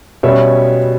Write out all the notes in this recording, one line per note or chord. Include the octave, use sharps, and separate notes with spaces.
B2 G3 C#4 C#5 E5